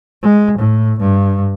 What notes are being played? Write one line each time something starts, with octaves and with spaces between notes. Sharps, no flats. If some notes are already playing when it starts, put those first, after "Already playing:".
G#3
A2
G2